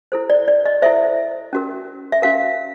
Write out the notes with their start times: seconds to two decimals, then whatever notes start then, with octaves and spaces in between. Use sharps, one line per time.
0.12 E4 A4 C5
0.30 D5
0.48 D5
0.65 D#5
0.82 E4 A4 C5 E5
1.53 C#4 F#4 A#4
2.12 E5
2.22 C#4 F#4 A#4 F5